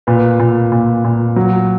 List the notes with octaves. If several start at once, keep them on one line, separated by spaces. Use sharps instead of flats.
A#2 B4
A#2
A#2
A#2
F#3